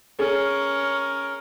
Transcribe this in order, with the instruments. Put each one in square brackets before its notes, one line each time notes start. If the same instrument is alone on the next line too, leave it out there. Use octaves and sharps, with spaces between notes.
[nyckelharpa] C#4 A#4 [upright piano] G#4 C#5